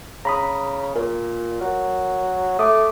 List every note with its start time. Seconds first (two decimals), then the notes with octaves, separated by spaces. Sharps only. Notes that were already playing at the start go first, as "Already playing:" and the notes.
0.25 C#3 A#5 B5 D#6
0.96 A#2 A#4
1.61 F#3
2.59 A3 D6 D#6